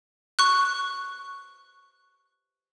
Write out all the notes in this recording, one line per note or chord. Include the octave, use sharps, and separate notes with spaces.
C#6 F#6